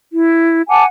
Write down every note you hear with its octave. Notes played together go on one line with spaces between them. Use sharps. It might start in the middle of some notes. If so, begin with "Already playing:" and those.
E4
F#5 G#5 A5 D6